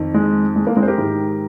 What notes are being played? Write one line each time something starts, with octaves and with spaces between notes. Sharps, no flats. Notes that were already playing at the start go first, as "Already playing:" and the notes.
Already playing: F2 D#3
G#3
G#3
A#3
G#3 C4
C5
G4 A#4
G#2 D#3